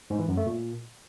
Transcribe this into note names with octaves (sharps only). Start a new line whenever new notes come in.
G#2
E3
F#2
A3
A#2